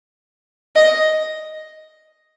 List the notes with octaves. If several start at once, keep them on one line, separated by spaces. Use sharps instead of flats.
D#5